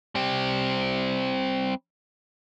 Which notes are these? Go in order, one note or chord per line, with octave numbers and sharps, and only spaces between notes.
G3 C4